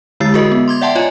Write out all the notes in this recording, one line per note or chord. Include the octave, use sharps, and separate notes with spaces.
D3 G#3 E4 E6 A6 C7
F#4 G#4 A#4 D#5
B3
C6 D6 G#6
D5 E5 F#5 G5 A5 C6
F4 C#5 D#5 G#5